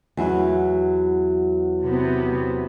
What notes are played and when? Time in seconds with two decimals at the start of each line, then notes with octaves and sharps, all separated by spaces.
0.17 E2 F#3 E4
1.84 C3 B3